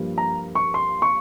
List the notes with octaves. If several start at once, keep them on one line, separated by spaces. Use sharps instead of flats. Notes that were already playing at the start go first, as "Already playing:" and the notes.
Already playing: G2 F3 A#3
A#5
C#6
C6
C#6